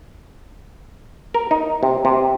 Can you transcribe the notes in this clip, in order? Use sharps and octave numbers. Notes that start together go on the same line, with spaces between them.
A#4
D#4
C3
C3